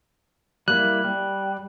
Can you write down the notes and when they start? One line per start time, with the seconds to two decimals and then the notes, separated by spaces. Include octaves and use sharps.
0.68 G3 A#3 E4 F#6
1.04 G3